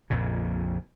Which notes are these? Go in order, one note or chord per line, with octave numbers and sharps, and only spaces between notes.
A#1 F2 A#2 C#3